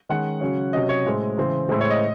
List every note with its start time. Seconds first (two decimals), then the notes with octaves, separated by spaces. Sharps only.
0.09 D#3 G#3 C#4 F#5
0.41 C#3 F#3 C#4
0.73 C3 F#3 C#4 D#5
0.89 C#5
1.05 A2 G#3 C4
1.38 C#3 E3 C4
1.69 A2 G#3 C4
1.81 C#5
1.90 D#5